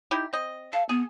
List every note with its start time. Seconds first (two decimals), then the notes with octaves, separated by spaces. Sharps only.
0.11 D#4 E4 G4
0.33 C4 D#5
0.73 A4 F5
0.89 B3 G#4